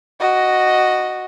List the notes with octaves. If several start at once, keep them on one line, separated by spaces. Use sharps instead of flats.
F#4 D#5